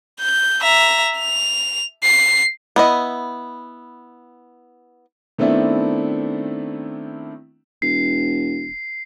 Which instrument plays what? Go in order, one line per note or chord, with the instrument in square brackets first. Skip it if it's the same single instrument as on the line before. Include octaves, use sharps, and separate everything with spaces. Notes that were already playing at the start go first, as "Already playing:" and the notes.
[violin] G6
E5 A#5
F7
C7
[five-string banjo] B3 E4 D#5
[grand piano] D#3 A3 B3 C4 D4 E4
[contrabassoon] E1 [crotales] C7